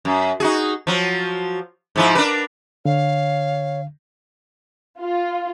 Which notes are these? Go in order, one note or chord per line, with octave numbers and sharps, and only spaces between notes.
F#2
D#4 F#4 G#4
F3 F#3
G#2 F3 E4
D4 A#4 B4
D3 C#5 F5
F4